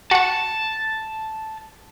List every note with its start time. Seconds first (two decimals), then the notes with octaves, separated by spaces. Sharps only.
0.11 F#4 F#5 A5